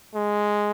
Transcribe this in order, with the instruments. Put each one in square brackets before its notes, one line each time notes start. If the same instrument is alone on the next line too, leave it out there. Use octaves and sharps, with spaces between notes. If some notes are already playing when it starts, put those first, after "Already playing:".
[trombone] G#3